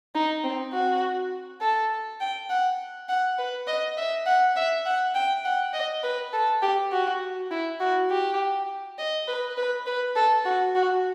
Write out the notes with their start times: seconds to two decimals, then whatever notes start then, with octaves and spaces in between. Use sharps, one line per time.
0.15 D#4
0.44 C4
0.73 F#4
1.61 A4
2.21 G5
2.50 F#5
3.09 F#5
3.38 B4
3.68 D#5
3.97 E5
4.26 F#5
4.56 E5
4.86 F#5
5.15 G5
5.45 F#5
5.74 D#5
6.04 B4
6.33 A4
6.62 G4
6.92 F#4
7.51 E4
7.80 F#4
8.10 G4
8.99 D#5
9.28 B4
9.57 B4
9.87 B4
10.16 A4
10.45 F#4
10.75 F#4